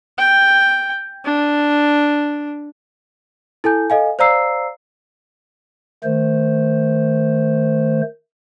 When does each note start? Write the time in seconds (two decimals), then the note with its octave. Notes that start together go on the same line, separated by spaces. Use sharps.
0.18 G5
1.25 D4
3.64 E4 A4 G#5 G6
3.90 A4 D#5 F5 G#5
4.19 C5 D5 F5 A#5 E6 C7
6.04 D#3 A3 C5